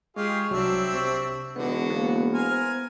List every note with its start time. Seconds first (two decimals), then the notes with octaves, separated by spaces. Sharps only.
0.16 G#3 F4 G4 G#4 C#6
0.51 C2 F#3 C4 D4 E5
0.93 C3 C5 C#6
1.56 E1 D3 B3 D#4 F#4 B4
1.90 A#3 B3 F5
2.34 A#4 C5 G#5 C6